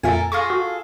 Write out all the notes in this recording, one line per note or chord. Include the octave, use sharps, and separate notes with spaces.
F2 A#2 A4 A#4 E5 G#5
F4 G#4 A4 C#6 A#6
F#4